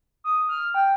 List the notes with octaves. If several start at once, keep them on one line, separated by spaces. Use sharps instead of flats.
D#6
F6
G5